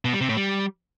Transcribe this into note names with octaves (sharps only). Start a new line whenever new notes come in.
B2
G3
C3
A2
G3